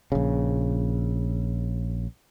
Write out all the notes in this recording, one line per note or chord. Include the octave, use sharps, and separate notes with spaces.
A#1 C#3